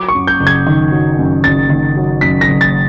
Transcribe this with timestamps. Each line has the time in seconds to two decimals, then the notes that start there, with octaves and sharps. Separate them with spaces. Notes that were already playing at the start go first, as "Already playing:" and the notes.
Already playing: F#3 D6
0.08 C#6
0.15 F#2
0.27 G6
0.40 F#1
0.47 G#6
0.67 D#3
0.92 F#3
1.19 F#2
1.44 F#1 A6
1.70 D#3
1.97 F#3
2.21 F#2 B6
2.41 A#6
2.48 F#1
2.61 A6